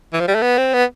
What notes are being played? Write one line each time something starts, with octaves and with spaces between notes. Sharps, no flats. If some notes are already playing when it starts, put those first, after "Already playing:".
E3
F3
G3
A3
B3
C4
B3